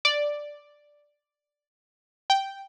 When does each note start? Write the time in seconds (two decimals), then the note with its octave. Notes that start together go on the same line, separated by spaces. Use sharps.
0.05 D5
2.30 G5